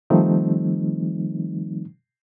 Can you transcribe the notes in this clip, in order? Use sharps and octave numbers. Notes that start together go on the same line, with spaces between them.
D#3 F3 G3 A3 C4 D#4